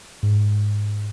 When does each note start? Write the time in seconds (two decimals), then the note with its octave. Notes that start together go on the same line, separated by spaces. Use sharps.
0.23 G#2